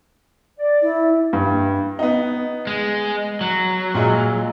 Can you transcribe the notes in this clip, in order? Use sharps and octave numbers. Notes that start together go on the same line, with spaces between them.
D5
E4
G2
B3 D#4
G#3
F#3
A#2 G#3